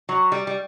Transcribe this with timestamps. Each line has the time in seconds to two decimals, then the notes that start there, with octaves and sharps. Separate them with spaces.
0.09 F#3
0.32 G3
0.47 G3